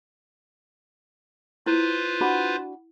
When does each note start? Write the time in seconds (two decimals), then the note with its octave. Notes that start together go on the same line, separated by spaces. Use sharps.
1.66 E4 F4 B4 C5
2.21 D4 F#4 B5